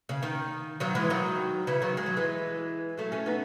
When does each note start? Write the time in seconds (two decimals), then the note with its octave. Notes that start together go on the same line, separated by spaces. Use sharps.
0.09 C#3
0.23 D#3
0.80 D#3 F#3
0.95 E3 G#3
1.10 D#3 F#3
1.67 C#3 E3
1.82 D#3 F#3
1.97 G#3
2.06 F#3
2.17 E3 G#3
2.98 F#3 A3
3.12 A3 C#4
3.26 B3 D#4